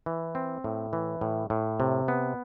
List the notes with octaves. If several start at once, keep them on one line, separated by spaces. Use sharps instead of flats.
E3
C4
A2
E3
A2
A2
C3
B3